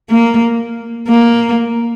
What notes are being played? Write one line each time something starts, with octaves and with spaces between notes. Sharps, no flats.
A#3
A#3